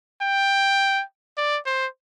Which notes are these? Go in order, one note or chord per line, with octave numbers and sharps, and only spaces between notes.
G5
D5
C5